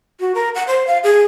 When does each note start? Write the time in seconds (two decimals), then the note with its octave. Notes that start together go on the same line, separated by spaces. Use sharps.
0.20 F#4
0.35 A#4
0.55 F#5
0.67 C5
0.87 F5
1.04 G#4